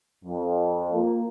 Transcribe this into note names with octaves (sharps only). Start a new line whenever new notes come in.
F2
A#3 F4